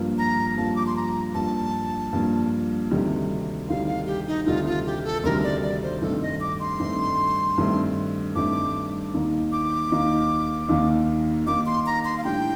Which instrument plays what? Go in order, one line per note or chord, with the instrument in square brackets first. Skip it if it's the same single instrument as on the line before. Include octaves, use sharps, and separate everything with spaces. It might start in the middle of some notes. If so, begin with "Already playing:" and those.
Already playing: [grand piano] G2 F3 A#3
[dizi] A#5
[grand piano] G2 F3 A#3 [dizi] A5
[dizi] D6
C6
A#5
[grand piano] G2 F3 A#3 [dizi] A5
[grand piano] G2 F3 A#3
D2 C3 D#3 G3
[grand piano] D2 C3 D#3 G3 [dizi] F5
[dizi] F5
G4
D#4
[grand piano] D2 C3 D#3 G3 [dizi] F4
[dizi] F4
G4
A4
[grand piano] D2 C3 D#3 G3 [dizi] A#4
[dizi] D5
D5
C5
[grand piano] G2 D#3 A3 C4 [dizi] A4
[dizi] D#5
D6
C6
[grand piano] G2 D#3 A3 C4
G2 D#3 A3 C4
[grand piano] G2 D#3 A3 C4 [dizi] D6
[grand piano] D#2 D#3 A#3 D#4
[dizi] D6
[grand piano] D#2 D#3 A#3 D#4
D#2 D#3 A#3 D#4
[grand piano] D#2 D#3 A#3 D#4 [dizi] D6
[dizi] C6
A#5
C6
F5
[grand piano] A2 G3 D4 [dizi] G5